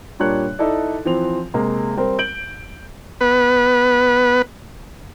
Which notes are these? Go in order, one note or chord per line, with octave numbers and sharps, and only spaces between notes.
A#2 G3 A#3 D4 C#5 F#6
D#4 E4 A4 D5
E3 F3 C4 F7
C3 G#3 A#3
G3 C4 A#4
G6 D7 F#7
B3 B4